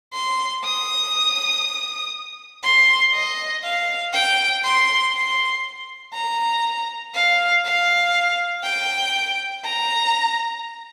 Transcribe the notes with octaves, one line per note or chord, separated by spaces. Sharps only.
C6
D#6
C6
D#5
F5
G5
C6
C6
A#5
F5
F5
G5
A#5